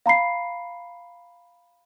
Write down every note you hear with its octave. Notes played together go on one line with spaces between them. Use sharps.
F5 A#5 B5 C7